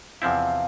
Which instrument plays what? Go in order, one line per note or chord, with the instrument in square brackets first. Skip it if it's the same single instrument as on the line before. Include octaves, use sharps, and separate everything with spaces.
[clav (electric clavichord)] E2 C3 F3 C4 E4 [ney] F5